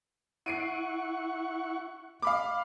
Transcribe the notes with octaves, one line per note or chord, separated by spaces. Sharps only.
E4 F#5 C#6 C7 D7 D#7
F5 B5 D6